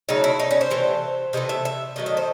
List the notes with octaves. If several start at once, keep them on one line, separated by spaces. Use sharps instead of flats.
C#3 F#3 A3 D#4
E4
D#4
C#4
C5
C3 E3 A3
C3 E3 A3 D#5
E5
E5
D#3 F#3 A3 D#5
D#5
C5